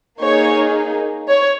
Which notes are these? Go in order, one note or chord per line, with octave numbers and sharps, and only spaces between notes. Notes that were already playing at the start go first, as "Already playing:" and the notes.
A#3 D#4 G#4 C#5
C#5